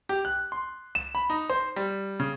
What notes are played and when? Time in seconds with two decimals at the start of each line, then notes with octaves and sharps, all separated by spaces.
0.09 G4
0.25 F#6
0.52 C6
0.95 E7
1.15 B5
1.30 D#4
1.50 C5
1.76 G3
2.20 C#3